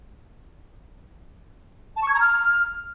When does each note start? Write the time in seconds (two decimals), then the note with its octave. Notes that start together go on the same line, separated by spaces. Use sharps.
1.96 A5
2.02 C#6
2.08 G#6
2.14 A#5
2.20 F6